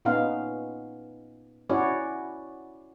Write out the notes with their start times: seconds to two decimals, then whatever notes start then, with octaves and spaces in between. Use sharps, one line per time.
0.05 A#2 B3 C#4 D#4 F5
1.70 C#4 E4 F#4 C#5 D5